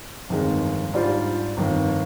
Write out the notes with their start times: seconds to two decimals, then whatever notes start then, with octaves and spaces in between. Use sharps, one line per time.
0.29 G1 F2 D#3 G#3
0.93 G#2 G3 D4 F4 C5
1.57 G1 F2 D#3